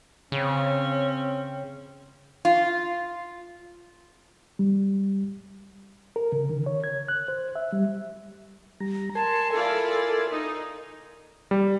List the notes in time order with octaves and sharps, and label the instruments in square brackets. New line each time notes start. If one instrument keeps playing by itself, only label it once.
[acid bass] C#3 [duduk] C4 [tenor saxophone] C#4
[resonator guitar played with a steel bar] F4
[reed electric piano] G3
A#4
C#3
D#3
C#5
G#6
F#6
C5
E5
G3
[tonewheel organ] G3 A#5
[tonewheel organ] A#4 G#5 C6 [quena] A5
[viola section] E4 F4 D5 [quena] A4
[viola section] D#4
[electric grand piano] G3